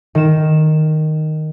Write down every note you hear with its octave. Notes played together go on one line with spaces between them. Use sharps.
D#3 E7